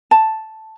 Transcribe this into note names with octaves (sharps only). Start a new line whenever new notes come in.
A5